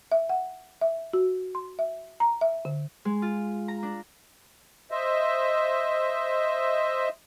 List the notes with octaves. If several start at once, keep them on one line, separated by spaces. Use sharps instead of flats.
E5
F#5
E5
F#4
C6
E5
A#5
E5
D3
G#3
F4
A#5
D4
C5 D#5 E5